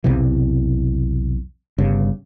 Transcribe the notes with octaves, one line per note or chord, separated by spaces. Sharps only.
B1 E2 C3 E3
G1 G2 C#3